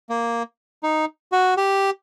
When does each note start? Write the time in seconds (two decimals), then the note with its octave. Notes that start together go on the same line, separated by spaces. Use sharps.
0.09 A#3
0.83 D#4
1.32 F#4
1.57 G4